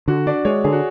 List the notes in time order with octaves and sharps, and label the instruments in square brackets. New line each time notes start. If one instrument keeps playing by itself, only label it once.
[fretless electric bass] D3 [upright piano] F#4
[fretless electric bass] D4 [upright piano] D5
[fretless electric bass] G#3 [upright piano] C#5
[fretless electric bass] D3 [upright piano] G#4
[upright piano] F#4